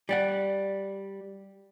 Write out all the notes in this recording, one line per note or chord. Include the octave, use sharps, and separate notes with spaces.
G3 D5 F#5